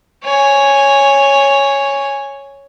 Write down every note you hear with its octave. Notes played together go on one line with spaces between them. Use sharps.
C#5 G#5